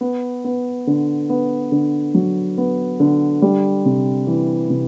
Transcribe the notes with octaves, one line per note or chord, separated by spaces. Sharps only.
B3
B3
D3
B3
D3
F#3
B3
D3
G3
C3
E3
C3